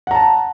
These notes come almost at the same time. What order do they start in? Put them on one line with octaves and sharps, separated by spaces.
F#5 A#5 A5